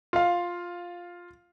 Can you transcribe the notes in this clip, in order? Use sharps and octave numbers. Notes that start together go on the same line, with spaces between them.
F4 F5